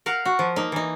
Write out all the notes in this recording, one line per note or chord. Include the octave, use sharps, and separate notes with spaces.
A#4 F5 F#5
F#4
F3
A#3 D#4
E3 D#4